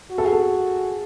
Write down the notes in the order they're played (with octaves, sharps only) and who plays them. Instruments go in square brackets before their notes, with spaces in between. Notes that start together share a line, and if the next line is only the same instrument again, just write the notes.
[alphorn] F#4
[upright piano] A4
G#4
A4